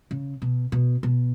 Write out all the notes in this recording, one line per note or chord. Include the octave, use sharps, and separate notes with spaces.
C#3
B2
B2
B2